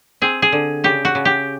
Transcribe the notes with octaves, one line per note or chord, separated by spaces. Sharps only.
C4 G#4
G#4
D3
C#3 G4
F#4
C#3
G4